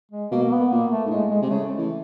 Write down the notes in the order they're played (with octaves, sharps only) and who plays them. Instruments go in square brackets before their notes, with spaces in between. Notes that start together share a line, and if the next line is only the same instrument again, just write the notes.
[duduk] G#3
[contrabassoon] B2 [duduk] A#3
[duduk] A#3
B3
[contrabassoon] A#2 [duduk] A#3
[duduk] A3
[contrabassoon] G#2
[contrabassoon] A2 [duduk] G#3
[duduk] G#3
[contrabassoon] C3 [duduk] G#3
[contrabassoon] C#3 [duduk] A3
[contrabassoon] E3